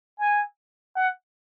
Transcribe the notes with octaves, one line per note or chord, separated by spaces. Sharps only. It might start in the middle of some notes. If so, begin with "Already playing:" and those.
G#5
F#5